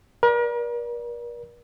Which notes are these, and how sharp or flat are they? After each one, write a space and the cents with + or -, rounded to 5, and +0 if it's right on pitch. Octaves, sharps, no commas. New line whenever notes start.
A#4 +40 D5 +0